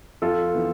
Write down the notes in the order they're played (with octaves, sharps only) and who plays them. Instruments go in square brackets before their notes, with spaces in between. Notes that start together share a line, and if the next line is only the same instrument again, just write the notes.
[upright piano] F2 [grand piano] F4 A4
[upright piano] E3 B3